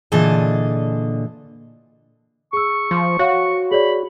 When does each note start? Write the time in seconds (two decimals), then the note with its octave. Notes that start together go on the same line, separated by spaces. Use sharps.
0.12 A#2 D3 E3 G#4 D#5 A5
2.53 G#4 C#6 E6
2.91 F3 C6
3.19 F#4 C#5 F5
3.71 G#4 C#5 D5 B5